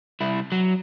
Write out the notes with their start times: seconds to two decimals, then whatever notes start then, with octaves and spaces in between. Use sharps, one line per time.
0.21 C2 E4
0.52 F#3